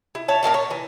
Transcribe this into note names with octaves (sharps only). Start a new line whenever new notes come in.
E4
C#5 E5 A5
A#2 A#4 F5 A5
C#5
E3